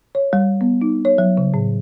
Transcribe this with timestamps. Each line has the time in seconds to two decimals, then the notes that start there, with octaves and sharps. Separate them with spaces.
0.15 C#5
0.33 G3
0.61 B3
0.82 D#4
1.05 C#5
1.18 F#3
1.37 C#3
1.54 A2